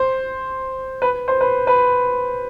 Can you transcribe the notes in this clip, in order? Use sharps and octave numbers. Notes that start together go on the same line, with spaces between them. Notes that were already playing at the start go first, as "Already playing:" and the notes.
Already playing: C5
B4
C5
B4
B4